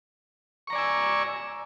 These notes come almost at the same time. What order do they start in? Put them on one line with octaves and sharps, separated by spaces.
C#6 A#5 D5 G#5 E6